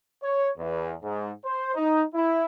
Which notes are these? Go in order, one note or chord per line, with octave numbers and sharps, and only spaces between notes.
C#5
E2
G#2
C5
D#4
E4